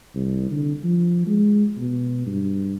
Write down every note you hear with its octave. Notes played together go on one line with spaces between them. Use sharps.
C2
D3
F3
G#3
B2
G2